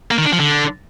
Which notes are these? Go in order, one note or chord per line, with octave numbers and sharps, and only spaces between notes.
A#3
D#3
D4
F3
D3